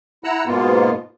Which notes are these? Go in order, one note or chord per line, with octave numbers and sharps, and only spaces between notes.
E4 F#5 A#5 E6 F#6
G#2 B2 A#3 B3 F4